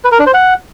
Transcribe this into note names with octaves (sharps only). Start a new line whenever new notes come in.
B4
A#4
D4
C5
F#5